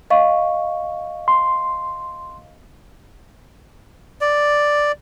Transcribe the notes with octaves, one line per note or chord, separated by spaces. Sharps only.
D#5 F5 C#6
C6
D5